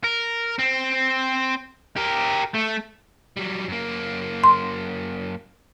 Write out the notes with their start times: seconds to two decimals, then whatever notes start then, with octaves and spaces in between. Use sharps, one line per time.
0.04 A#4
0.59 C4
1.97 G4 A#4
2.54 A3
3.37 F#3 G3
3.68 F#2 A#3
4.44 C6